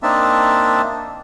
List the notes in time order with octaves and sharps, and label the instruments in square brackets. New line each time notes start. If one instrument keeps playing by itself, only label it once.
[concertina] A#3 C4 D4 D#4 E5 A5